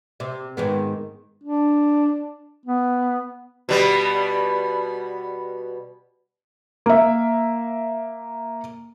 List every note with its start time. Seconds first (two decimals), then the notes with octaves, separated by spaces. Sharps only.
0.20 C3
0.57 G#2 D#3 B3
1.43 D4
2.66 B3
3.69 B2 G3 B3
6.86 A#3 E5